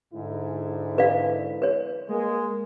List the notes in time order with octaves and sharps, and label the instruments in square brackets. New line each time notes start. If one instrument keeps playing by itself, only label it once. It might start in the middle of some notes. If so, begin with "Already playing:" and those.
[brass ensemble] G#2 D3 E4
[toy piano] B4 D5 F5
B4 C#5
[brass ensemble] G#3 A#3